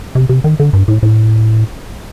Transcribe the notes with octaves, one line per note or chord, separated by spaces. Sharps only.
C3
C3
D#3
D3
G2
A2
A2